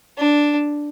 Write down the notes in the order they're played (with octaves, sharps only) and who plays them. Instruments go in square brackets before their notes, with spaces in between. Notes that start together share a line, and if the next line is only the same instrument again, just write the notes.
[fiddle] D4